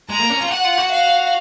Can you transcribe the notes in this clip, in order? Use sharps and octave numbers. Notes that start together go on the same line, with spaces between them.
G#3 A#5
A#3
C#4
F4
F#4 F#5
F4
F#4
F5